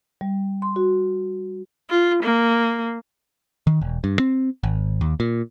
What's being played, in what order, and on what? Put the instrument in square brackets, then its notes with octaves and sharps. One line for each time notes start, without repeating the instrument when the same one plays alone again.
[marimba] G3
C6
F#4
[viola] F4
A#3
[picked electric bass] D#3
E1
G2
C4
G#1
D#2
A#2